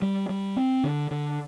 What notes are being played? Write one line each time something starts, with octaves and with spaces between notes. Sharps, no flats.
G3
G3
C4
D3
D3